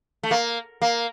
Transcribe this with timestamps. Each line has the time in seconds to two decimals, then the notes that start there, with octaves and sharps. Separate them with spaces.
0.23 A3
0.31 A#3
0.82 A#3